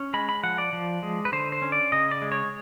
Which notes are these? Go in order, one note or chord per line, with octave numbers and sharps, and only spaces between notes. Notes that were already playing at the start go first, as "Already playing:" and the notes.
Already playing: C#4
G#3 B5
B5
F3 F#5
D5
F3
G#3
B4
D3 C5
C5
C#4
D5
C#3 D#5
D5
G#3
C#5